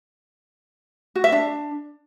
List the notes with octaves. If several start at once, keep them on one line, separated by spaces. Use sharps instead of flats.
F#4
E5
D4